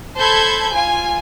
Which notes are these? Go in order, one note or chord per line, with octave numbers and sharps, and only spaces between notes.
A4 C5 A5 B5 G6 G#6
F4 G#5